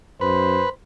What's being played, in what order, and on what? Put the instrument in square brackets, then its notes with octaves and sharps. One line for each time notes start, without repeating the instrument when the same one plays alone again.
[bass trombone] F#2 [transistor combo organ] B4 [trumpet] C5